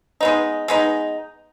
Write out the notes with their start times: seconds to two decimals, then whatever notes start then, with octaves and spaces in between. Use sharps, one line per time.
0.21 G#3 B3 D#4
0.68 G#3 B3 D#4